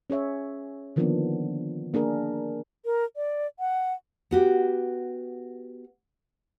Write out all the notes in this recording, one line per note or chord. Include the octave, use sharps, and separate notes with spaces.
C#4 G#4 C#5 E5
D3 D#3 F3 A#3 B3 D4
A#3 D4 G#4 A#4
A#4
D5
F#5
B3 F#4 G4